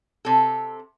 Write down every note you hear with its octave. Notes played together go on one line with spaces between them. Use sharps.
C3 A4